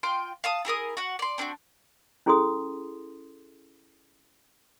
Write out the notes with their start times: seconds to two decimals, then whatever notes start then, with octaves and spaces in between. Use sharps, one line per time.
0.03 F4 G5 C6
0.44 F5 A5 D#6
0.65 E4 G#4 A#4 D#6
0.97 F#4 F#5
1.19 D5 C6
1.38 C4 D4 F4 F#4
2.26 C#4 E4 G#4 A4 C6 D#6